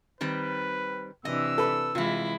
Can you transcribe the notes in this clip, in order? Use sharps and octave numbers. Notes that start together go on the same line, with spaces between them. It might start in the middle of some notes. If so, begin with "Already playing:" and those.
D#3 G3 C4 B4
C3 E3 D4 D#5 E6
A4 B4
C3 E3 G#3 E4 F4